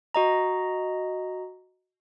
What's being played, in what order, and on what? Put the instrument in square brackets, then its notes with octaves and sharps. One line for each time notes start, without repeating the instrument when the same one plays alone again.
[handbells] F#4 D#5 A#5